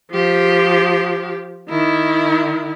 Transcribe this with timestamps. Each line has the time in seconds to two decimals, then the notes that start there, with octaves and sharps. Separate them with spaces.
0.11 F3 G4
1.69 D#3 E4